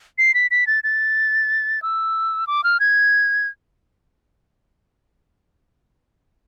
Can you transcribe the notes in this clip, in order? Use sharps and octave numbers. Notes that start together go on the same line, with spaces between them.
C7
B6
B6
A6
A6
E6
D6
F6
G#6